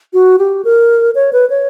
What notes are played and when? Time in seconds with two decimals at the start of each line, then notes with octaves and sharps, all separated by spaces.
0.13 F#4
0.39 G4
0.65 A#4
1.15 C#5
1.33 B4
1.50 C#5